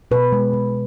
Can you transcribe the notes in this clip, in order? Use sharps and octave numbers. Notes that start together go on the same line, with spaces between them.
B2 B4
G#3
G#3